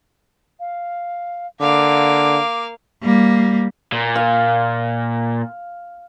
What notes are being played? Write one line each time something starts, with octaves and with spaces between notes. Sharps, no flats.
F5
D3 A#3 F5 D6
G3 A#3
A#2
F5